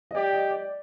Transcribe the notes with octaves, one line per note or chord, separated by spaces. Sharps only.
D#5
G4 D5
D#5
D5